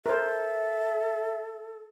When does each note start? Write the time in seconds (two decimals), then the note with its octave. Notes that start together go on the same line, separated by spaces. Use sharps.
0.06 A4 A#4 C5 E5